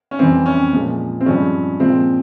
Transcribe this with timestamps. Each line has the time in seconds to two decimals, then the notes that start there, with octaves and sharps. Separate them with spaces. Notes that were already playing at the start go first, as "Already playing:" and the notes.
0.11 C#4
0.19 F2 E3 G3 C4
0.46 C#4
0.73 A#2 F3 G#3
1.21 C4
1.26 G2 F3 G#3 C#4
1.80 A#2 F3 G#3 C4